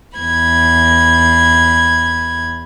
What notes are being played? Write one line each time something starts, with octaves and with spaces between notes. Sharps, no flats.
E2 B5 G#6